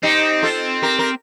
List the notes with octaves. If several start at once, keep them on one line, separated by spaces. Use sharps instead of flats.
C4 D#4 G4
F4 A4
G4 A#4
A#4